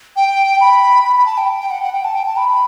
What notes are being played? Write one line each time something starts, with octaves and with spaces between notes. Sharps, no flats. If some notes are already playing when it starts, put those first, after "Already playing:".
G5
B5
B5
B5
A5
G5
G5
F#5
F#5
G5
A5
G5
A5
B5